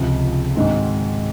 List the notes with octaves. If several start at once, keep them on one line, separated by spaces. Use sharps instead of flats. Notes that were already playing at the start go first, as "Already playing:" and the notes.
Already playing: C#2 C3 F3 G#3
G#2 D#3 G#3 C4 F#4